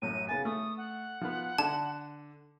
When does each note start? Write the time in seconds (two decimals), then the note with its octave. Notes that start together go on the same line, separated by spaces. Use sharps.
0.02 A1 F#2 A2 D#7
0.29 C#3 B3 G#5 A6
0.45 A3 D#6
0.77 F#5
1.21 F3 B3
1.58 D3 A5